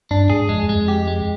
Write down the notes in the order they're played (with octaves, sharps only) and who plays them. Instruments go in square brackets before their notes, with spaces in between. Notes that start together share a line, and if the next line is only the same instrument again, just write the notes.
[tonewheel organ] G2 [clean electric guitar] D4
[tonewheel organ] G#2 [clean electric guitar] G#4
[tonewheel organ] F2 [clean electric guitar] G#3
[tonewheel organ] F2
[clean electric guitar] G#3
[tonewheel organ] F2
[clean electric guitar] G4
G#3